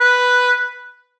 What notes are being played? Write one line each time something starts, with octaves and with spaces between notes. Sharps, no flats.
B4